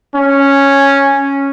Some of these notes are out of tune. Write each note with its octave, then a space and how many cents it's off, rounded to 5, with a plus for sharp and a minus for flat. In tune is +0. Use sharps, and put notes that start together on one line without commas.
C#4 -5